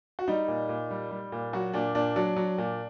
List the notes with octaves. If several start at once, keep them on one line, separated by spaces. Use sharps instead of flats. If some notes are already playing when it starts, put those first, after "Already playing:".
F#4
G3 D#4
A#2
A#2
G3
G3
A#2
F#3 F#4
A#2 D4
A#2 D4
F#3 D4
F#3
A#2